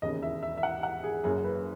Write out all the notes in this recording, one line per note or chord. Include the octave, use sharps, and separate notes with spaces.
E1 D#2 C#3 D#5
E5
E5
E5
F#5
F#5
G#4
F#1 F#2 C#3 G#4
B4